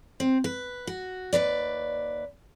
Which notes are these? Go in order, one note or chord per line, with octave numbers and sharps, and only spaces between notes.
C4
B4
F#4
D#2 C3 B4 D5